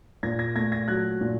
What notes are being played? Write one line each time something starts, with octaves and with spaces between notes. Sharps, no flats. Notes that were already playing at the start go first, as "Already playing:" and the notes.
A#2 G#6 A#6
G#6 A#6
A3 G#6 A#6
G#6 A#6
F#3 F#6 G#6
A#2